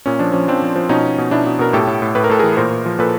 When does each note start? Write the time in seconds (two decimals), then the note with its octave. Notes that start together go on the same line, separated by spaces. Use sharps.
0.06 A#2 C#4
0.19 F3 D4
0.32 F3 C#4
0.48 F3 C4 D4
0.62 F3
0.76 F3
0.89 B2 C#4 D#4
1.03 B2
1.18 B2
1.31 B2 D4 E4
1.46 B2
1.59 B2 A#4
1.73 A2 G4 A4
1.87 A2
2.02 A2
2.15 A2 B4
2.24 A#4
2.30 A2 A4
2.39 G#4 A#4
2.43 E3
2.57 A#2 A#4 C5
2.71 A#2
2.86 F3
2.99 A#2 A4 B4